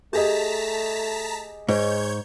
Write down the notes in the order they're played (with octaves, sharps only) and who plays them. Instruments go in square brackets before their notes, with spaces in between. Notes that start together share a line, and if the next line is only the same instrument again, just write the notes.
[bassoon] A3 [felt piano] G4 G#4 D#5 [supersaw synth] A5 A#5 B6
[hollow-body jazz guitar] G#2 [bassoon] G#3 [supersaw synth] C#5 G6 G#6